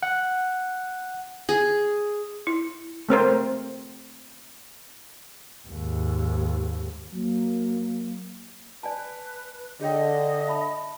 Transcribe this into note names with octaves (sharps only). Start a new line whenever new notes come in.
F#5
G#4
E4
A3 C4 A#4 C5
D#2 G#2
F#3 A#3
B4 D5 G#5 A5
D3 G#4 C#5 D#5 G5
E5 A5 B5